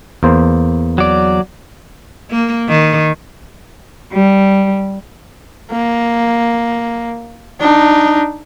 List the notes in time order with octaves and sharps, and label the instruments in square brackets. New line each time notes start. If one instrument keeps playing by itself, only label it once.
[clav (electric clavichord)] E2 A#3 C5
[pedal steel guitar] F#3 D5
[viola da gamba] A#3
D#3
[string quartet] G3
[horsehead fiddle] A#3
D4 D#4